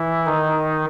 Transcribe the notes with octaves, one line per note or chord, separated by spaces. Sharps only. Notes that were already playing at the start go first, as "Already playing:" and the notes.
Already playing: E3 E4
D#3 D#4